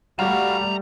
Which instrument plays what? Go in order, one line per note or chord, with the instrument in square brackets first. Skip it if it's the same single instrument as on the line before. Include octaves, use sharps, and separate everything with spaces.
[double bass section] G3 A3 [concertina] F#4 F5 [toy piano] F#5 [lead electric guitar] A5 A#5